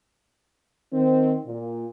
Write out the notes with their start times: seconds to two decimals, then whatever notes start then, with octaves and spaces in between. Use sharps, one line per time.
0.93 D#3 C4
1.47 A#2